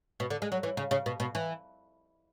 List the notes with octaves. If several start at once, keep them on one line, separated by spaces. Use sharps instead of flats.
B2
D3
G#3
F#3
E3
C#3
C#3
B2
B2
E3